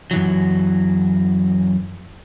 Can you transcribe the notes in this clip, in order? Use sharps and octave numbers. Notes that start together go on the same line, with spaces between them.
F#2 E3 F#3